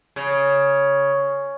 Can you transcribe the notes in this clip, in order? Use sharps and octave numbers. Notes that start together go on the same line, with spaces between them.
C#3